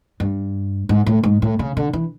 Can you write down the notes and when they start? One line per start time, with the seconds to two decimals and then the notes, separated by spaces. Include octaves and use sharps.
0.20 G2
0.89 G#2
1.06 A2
1.24 G#2
1.42 A2
1.59 C#3
1.77 D3
1.93 E3